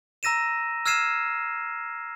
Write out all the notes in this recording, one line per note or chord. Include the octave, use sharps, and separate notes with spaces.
A#5 E6 A#6 D#7 E7
E6 F6 G#6 C7 D#7 E7